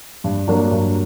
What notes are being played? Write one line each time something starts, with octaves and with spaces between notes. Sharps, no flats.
G2
F#3 A#3 D4
G2